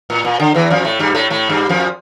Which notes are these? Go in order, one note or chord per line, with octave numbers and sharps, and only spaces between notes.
A2
A#2
D3
E2 E3
F2 F3
A2 A3
G2 G3
A2 A3
A2 A3
G2 G3
F2 F3